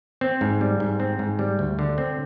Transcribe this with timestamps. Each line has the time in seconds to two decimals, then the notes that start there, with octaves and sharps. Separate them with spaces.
0.21 C4
0.41 G#2
0.61 G3
0.80 G#2
1.00 C4
1.19 G#2
1.39 G3
1.59 D2
1.79 D3
1.98 C4